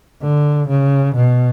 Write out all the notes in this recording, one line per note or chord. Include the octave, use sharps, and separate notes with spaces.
D3
C#3
B2